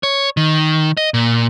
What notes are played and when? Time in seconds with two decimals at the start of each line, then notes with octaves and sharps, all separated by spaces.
0.03 C#5
0.37 D#3
0.97 D#5
1.14 A#2